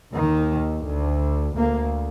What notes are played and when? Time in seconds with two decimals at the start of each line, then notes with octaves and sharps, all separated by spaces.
0.14 D#2 D#3
0.85 D2
1.57 D2 A#3